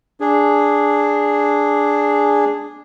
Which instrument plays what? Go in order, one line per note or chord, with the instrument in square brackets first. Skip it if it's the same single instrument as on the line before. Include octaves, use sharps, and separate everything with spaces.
[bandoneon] D4 G#4